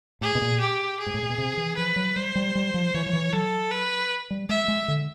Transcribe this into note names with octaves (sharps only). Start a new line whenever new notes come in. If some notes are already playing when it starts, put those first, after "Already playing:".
A2 G#4
B2
A#2
G4
G#4
G#2
A2
A#2
B2
C3
E3
F3 B4
F#3
G3 C5
G3
G3
F3
E3 C#5
F3
E3
F#3 A4
B4
G3
G#3 E5
G#3
D3